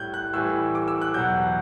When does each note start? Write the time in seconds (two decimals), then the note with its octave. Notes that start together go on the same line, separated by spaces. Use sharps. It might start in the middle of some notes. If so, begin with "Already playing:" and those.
Already playing: A2 G3 F#6 G6
0.14 F#6
0.33 A2 E3 G3 E6
0.75 D6
0.88 E6
1.01 F#6
1.14 E2 B2 F#3 G6